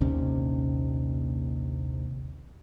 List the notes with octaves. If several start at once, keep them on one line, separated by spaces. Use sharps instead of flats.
A#1 D#2 C3 C#4